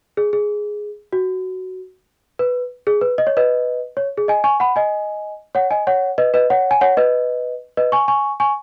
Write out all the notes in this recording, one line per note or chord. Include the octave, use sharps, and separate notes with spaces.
G#4
G#4
F#4
B4
G#4
B4
D#5
C#5
B4 D#5
C#5
G#4
D#5 G#5
G#5 C#6
F#5 B5
D#5 G#5
C#5 F#5
D#5 G#5
C#5 F#5
B4 D#5
B4 D#5
C#5 F#5
G#5
C#5 F#5
B4 D#5
B4 D#5
G#5 C#6
G#5 C#6
G#5 C#6